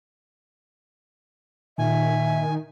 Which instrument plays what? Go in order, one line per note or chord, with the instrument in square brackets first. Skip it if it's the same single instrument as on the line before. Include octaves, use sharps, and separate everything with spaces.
[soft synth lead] A#2 [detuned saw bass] D#3 [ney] E5 [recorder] G#5